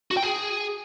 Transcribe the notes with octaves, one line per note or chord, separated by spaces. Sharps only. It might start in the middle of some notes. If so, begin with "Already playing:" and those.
F#4
G5
G#4